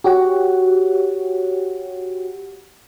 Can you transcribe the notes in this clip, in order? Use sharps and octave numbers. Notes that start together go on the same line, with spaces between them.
F#4 G4 C#5 F#5